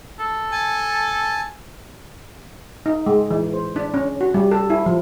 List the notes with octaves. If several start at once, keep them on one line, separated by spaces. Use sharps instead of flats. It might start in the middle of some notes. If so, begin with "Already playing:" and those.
A4
G#5 A5
D#4
G#3
E3
C5
D4
C#4
F#4
G3
A4
E4
F3